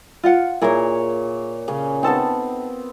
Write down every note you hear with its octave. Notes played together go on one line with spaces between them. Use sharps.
F4 F5 F#5
A#2 E4 G#4 A#4 C#5
C#3 C#4
B3 C4 D#4 A4 A5